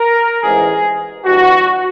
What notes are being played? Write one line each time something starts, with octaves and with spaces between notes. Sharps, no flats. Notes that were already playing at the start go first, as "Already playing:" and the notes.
Already playing: A#4
A1 G#2 E3 G#4
G1 G2 E3 F#4